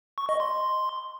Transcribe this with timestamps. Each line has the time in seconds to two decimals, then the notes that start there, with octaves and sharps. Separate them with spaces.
0.18 C#6
0.29 D#5
0.40 C6